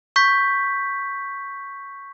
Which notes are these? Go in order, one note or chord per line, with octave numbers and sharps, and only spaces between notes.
C#6 G6 B6